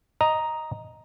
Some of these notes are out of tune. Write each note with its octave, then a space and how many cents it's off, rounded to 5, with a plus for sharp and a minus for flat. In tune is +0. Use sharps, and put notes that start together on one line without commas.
D#5 +0 A#5 +5